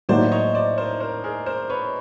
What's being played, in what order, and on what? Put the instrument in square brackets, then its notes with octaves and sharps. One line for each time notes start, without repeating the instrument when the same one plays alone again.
[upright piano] A2 F#3 A#3 D#4 F#4 [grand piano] C5 D5
[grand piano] C#5 D#5
C5 D5
A#4 C5
A#4 C5
G#4 A#4
A#4 C5
B4 C#5